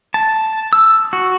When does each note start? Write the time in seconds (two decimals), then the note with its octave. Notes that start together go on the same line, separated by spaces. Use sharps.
0.14 A5
0.73 E6
1.13 F#4